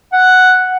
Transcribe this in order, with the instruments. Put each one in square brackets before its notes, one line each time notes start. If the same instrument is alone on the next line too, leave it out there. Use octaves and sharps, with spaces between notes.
[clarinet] F#5